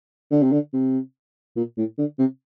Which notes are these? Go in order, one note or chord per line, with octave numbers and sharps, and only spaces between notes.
D3
C3
D3
C3
A#2
A2
D3
C3